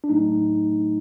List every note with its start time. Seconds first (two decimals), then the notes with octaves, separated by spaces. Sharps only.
0.04 D4
0.09 A2 F#3 A3 D#4